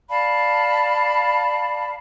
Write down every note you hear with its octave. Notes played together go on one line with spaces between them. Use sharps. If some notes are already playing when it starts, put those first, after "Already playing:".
D5 F5 A5 B5